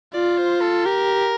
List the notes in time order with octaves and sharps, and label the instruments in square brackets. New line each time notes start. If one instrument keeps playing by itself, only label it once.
[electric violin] F4 [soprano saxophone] D5
[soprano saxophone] C5
A4
[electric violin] G4 [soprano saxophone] A#4